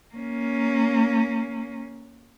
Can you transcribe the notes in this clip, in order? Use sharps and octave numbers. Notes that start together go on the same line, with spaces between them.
A#3 C#4